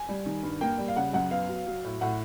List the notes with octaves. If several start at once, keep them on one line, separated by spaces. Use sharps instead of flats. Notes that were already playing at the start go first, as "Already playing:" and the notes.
Already playing: G#5
G3
D#3
G2
A#3 G5
G3
F5
C#3 F#5
F#2 F#5
B3 F5
F#3
F#3
A2
A2 F#5